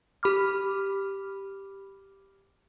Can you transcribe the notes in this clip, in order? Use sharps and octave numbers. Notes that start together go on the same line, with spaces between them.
G4 B5 D6 F6